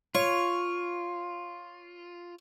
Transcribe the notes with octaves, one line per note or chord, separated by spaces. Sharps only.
F4 C#5